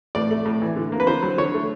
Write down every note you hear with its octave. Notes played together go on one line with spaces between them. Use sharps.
A2 D5
A3
A2
E3
D3
A#3
B4
D3 C5
F#3
D3 C#5
A3